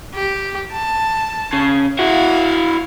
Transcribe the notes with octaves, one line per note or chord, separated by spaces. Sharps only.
G4
A5
C#3
E4 F#4 F5